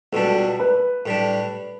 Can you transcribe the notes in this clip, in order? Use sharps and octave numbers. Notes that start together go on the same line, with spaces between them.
C#2 B2 G3 D4 A4
B4
A2 G3 D4